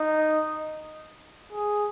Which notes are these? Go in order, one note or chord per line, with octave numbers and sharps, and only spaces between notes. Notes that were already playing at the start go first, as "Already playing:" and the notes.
Already playing: D#4
G#4